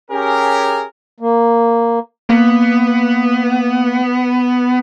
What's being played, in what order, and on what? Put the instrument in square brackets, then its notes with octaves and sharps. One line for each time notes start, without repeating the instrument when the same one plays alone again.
[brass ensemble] C#4 G4 G#4 A#4
[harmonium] A#3
[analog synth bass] A#3 [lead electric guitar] B3